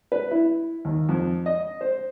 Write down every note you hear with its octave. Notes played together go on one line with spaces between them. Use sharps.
B4
E4
D#2
F2
D#5
C5